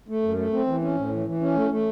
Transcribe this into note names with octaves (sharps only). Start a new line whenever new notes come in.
A3
F#2
A3
C4
E3
C#4
A2
E3
E3
C#4
A3
A3